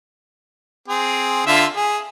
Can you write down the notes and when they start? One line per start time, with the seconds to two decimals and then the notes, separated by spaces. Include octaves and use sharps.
0.88 C4 G#4
1.47 D3 F4 E5
1.76 G#4